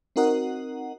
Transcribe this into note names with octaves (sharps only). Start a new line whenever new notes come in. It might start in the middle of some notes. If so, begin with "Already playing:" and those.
C4 D#4 F#4 A#4 D#5 F#5